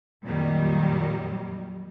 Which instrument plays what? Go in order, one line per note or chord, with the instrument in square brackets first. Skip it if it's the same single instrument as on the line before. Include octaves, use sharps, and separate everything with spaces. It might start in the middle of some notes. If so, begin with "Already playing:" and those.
[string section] F2 A#2 D#3 F#3 G3